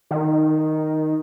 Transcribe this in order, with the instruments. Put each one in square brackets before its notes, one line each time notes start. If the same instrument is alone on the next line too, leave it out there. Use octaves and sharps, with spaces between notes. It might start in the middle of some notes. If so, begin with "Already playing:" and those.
[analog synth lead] D#3